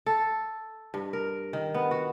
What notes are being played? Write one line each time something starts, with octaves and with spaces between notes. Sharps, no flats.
A4
G2
A#4
D#3
B3
F#4